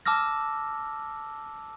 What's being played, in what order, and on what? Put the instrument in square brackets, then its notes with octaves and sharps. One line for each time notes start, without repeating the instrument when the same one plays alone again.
[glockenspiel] A5 D6 E6 F6 A#6